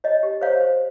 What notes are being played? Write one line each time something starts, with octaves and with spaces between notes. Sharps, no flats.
C#5 D#5
G4
C5 C#5 F5
C5